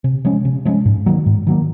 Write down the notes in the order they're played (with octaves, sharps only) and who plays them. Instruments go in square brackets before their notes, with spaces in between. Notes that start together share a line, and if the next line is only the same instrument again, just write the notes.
[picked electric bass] C3
F3 G#3 C#4
C3
F3 G#3 C#4
G#2
D#3 F#3 A#3
G#2
D#3 F#3 A#3